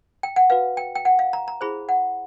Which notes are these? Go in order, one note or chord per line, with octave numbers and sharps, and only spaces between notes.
G5
F#5
F#4 B4 F5
G5
G5
F#5
F5
A#5
A#5
E4 G#4 C5 B5
F#5